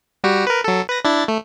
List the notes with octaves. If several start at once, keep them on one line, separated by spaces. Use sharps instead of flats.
G3 F#4 G4
A#4 B4
F#3 A4
B4 A#6
D4 E4 A6
A3